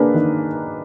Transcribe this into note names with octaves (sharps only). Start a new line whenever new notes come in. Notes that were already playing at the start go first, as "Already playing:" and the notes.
Already playing: A#3 D4 G#4 B4
D#3